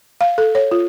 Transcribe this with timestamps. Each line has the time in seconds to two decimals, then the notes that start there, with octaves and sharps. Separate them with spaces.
0.21 F5
0.38 A4
0.55 C#5
0.71 F4